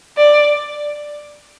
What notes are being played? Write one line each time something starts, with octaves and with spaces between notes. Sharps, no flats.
D5